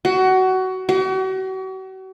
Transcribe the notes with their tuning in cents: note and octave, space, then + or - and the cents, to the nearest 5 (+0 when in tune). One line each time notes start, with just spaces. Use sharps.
F#4 +20
F#4 +40